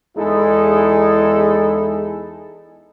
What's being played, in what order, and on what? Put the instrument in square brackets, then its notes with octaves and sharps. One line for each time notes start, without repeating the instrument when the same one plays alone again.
[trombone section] E2 G#3 D#4 E4 G#4 A4